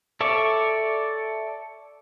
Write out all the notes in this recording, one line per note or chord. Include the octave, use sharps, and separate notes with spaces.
A4 C#5 D5 E5